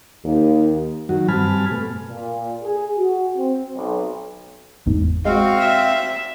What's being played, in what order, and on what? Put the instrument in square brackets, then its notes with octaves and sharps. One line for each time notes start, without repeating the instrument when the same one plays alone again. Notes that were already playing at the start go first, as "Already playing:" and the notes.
[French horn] D#2
[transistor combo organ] F#2 D#3 F#3 F#4
G2 C4 G#5 A5 B5 F6
B2 A3
[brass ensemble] A#2
G#4
F#4
C4
B1
[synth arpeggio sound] G1 E2 G#2
[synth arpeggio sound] G#3 [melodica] C4 F5 [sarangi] F#4
[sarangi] E5